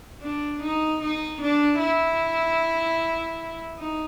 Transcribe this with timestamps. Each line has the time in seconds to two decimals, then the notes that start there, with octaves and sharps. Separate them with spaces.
0.22 D4
0.62 D#4
1.01 D#4
1.41 D4
1.80 E4
3.77 D#4